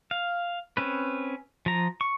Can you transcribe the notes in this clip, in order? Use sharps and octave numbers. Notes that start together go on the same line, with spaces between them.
F5
C4 C#4 B4
F3 A#5
C#6